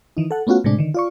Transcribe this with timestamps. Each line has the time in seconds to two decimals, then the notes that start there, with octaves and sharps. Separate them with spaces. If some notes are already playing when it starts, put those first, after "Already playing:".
0.17 D#3 E3 D#4
0.31 A4 F#5
0.47 A3 B3 C#4 F4 F#4
0.64 A2 C3 G#3 D4
0.78 D3 D#3
0.94 F4 D5 C#6